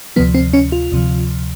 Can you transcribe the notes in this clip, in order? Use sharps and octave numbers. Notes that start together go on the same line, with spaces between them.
D2 C3 F3 B3
C4
C#4
F4
D2 C3 F3